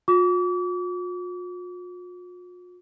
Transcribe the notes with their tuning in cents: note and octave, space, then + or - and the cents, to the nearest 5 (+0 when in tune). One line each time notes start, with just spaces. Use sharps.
F4 +45 D6 -40